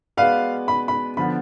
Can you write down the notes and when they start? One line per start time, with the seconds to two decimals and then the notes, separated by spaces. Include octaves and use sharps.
0.17 G#3 B3 F#4 B4 D5 F5
0.68 B5
0.88 B5
1.17 D3 F3 B3 B5